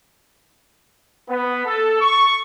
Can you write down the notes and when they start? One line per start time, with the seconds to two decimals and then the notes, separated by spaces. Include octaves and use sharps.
1.29 B3
1.66 A4
2.01 C#6